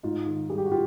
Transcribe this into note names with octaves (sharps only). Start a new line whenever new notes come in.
G#2 D#4 F4
D#3
G3 G#4
G4
F#4
F4 G4